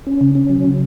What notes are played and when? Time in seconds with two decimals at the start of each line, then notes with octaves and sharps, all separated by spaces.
0.07 C#4
0.21 C#3
0.35 C#4
0.49 F#3
0.65 C#3